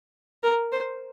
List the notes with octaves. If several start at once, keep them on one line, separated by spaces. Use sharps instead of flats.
A#4
C5